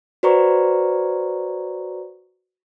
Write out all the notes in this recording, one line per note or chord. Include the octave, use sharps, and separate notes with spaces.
F#4 B4 C5 D5 A#5 C#6